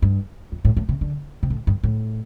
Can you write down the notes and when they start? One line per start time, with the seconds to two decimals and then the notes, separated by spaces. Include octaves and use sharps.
0.02 G2
0.52 F2
0.65 A2
0.77 A2
0.89 C3
1.01 D3
1.43 C3
1.50 A2
1.67 G2
1.84 A2